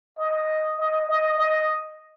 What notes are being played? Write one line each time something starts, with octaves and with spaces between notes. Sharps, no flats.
D#5
D#5
D#5
D#5